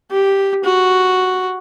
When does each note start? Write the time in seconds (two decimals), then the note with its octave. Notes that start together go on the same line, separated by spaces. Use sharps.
0.11 G4
0.64 F#4